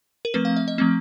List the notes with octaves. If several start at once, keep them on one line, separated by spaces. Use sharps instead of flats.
A#4
F3 A3 C4 B4
F5
E5
D#5
F3 A3 C4